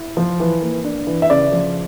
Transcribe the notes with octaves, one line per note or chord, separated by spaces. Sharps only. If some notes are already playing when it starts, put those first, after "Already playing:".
Already playing: E4
F3
E3
A#3
D4
E3
E5
C#3 D5
F3